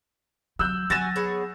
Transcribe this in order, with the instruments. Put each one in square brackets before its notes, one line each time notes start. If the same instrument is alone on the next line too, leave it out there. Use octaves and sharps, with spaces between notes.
[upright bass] F#3 [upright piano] E6 F#6 G6
[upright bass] F#3 [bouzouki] F#4 G#5 [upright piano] A6 A#6 E7
[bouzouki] B3 G#4 C#5